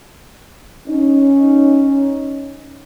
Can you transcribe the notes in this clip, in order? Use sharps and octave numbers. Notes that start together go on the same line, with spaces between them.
C#4 D#4